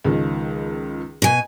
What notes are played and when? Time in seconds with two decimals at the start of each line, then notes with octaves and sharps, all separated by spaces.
0.04 C#2 D#3 F3
1.22 B2 G#5